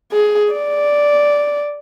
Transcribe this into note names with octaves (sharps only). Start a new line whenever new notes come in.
G#4
D5